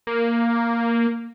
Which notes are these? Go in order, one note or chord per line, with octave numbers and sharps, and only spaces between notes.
A#3